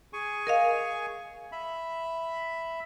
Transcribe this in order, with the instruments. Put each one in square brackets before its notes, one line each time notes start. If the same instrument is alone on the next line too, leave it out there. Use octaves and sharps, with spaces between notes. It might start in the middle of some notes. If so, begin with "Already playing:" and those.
[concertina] G#4 G#5 C#6
[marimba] A#4 D#5 F5
[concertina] E5 B5